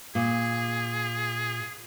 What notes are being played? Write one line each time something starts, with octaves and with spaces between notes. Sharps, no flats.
A#2 G#4